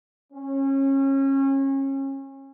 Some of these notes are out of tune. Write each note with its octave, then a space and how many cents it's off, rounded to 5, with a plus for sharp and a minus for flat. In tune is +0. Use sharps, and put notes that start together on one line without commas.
C#4 -30